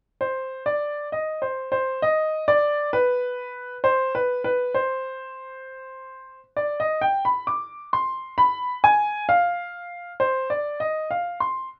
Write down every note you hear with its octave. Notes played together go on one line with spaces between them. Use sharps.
C5
D5
D#5
C5
C5
D#5
D5
B4
C5
B4
B4
C5
D5
D#5
G5
B5
D6
C6
B5
G#5
F5
C5
D5
D#5
F5
C6